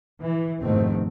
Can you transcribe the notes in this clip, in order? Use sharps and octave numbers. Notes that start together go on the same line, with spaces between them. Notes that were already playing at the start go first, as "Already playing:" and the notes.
E3
F1 G#2 B2 D#3 A3 C4